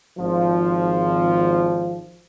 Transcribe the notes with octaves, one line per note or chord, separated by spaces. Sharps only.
G#1 F3